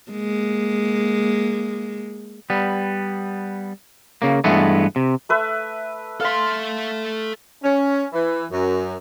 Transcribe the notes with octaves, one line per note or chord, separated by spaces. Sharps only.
G#3 A#3
G3 B3
C#3 A#3
G2 E3 G#3 A3 B3
C3
A3 B4 E5
A4 E5 F5 C6
C#4
E3
F#2